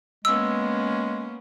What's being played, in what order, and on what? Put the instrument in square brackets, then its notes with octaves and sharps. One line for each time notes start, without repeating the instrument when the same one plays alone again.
[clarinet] G#3 [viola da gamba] A#3 B3 C#4 [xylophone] E6